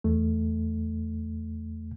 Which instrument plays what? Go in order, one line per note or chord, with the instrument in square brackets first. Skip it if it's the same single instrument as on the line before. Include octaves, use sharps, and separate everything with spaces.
[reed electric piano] E2 A3